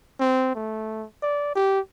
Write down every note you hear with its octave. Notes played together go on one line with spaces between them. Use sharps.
C4
A3
D5
G4